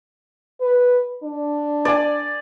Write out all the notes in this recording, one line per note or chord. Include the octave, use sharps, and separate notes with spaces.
B4
D4
D5 G#5